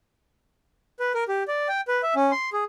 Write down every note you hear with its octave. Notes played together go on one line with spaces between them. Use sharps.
B4
A#4
G4
D5
G5
B4
E5
C#4
C6
G#4